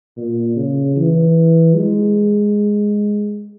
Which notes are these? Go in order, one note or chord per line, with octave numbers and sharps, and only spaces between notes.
A#2
C#3
E3
G#3